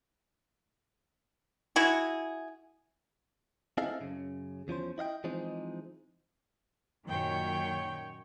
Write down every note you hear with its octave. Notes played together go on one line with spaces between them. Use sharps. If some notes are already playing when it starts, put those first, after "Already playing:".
E4 F#4 G#4
C4 E4 G#4 A4 D#5 F5
F#2 C#3
E2 F3 C#4 C5
E4 D#5 F5 G5
E3 F3 G#3 C4 D#4
F#2 A#2 D#3 C#5 G5